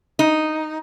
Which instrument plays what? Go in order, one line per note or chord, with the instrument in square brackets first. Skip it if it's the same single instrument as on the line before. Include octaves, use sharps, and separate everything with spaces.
[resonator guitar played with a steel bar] D#4